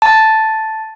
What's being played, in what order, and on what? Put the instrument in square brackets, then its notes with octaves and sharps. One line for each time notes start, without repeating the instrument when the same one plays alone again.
[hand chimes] A5